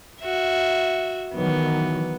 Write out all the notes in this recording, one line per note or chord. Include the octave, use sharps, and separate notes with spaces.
F#4 E5
D#3 E3 F#3 B3